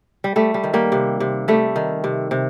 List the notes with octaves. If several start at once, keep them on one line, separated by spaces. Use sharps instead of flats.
G3
G3 A3
G3
D#3
G3 A#3
C3
C3
G3 A3
D#3
C3
C3